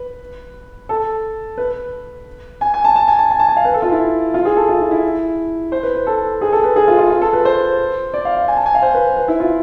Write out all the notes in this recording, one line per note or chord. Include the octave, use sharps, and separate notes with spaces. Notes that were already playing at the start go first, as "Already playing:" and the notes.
Already playing: B4
A4
B4
G#5
G#5
A5
A5
G#5
A5
G#5
A5
G#5
F5
B4
A4
F4
E4
F4
G#4
A4
F4
E4
E4
C5
B4
B4
A4
G#4
A4
B4
G#4
F4
F4
F4
A4
B4
C5
D5
F5
F5
G#5
A5
G#5
F5
C5
B4
B4
E4
F4